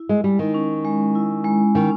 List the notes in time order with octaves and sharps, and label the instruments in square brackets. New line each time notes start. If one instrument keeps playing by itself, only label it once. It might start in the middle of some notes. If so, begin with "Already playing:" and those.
Already playing: [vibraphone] E4
[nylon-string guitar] G#3
[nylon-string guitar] G3 [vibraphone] G#3
[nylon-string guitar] D#3
[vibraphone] C#4
G#3
E4
G#3
[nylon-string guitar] D#3 [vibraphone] C#4